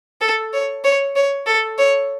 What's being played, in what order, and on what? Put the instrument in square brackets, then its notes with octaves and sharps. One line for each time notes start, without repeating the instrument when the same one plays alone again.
[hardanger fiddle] A4
C#5
C#5
C#5
A4
C#5